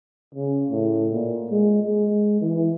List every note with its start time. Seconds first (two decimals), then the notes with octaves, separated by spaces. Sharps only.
0.35 C#3
0.70 A2
1.12 A#2
1.51 G#3
1.83 G#3
2.41 E3